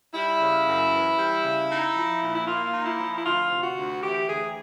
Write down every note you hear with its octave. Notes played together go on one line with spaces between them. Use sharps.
G3 E4
C#3
F#2
E3
G3
C#3
D#4
F3
A#2
E4
A#3 F4
D#4
E4
F3
E4
D2 F4
C3
F#4
D2
E3 G4
D2 G#4